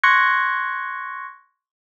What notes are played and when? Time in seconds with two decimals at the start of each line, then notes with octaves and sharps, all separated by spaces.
0.03 C6 C#6 F#6 G#6 A#6 C#7